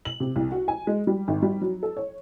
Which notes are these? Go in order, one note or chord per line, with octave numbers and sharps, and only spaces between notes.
F#7
C3
C2
F#4
G#5
G#3
G3
G#1
G3
F#3
A4
C#5